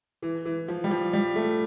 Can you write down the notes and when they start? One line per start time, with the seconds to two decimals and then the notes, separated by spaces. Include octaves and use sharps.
0.22 E3
0.45 E3
0.68 F3
0.84 G3
0.91 F3
1.13 G3
1.36 A3